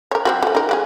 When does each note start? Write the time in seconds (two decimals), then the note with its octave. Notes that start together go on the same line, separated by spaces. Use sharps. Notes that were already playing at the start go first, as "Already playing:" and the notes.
0.11 A#4 C#5
0.25 F#3 C4 F#4
0.42 F#3 A3
0.55 D#4 A#4
0.69 G#3 F#4 G#4